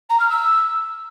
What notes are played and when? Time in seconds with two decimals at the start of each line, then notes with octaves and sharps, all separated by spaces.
0.09 A#5
0.19 F6
0.29 E6